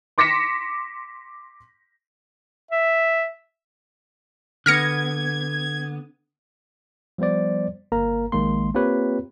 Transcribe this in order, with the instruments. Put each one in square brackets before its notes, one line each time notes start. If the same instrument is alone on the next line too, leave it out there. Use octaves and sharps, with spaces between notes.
[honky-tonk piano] C6 D6 A#6 B6 C#7 E7
[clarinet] E5
[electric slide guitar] D3 B3 [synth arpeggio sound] F6 A#6 C#7 [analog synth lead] G#6
[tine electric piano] F3 G3 B3 C5 D5
G1 A#3 A#4 A#5
A#1 D#3 G#3 A#3 C6
A#3 C4 F4 G4 B4 C#5